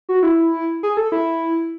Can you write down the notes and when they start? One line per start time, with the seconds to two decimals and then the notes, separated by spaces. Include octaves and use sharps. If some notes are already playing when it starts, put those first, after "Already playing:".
0.09 F#4
0.23 E4
0.83 G#4
0.97 A4
1.12 E4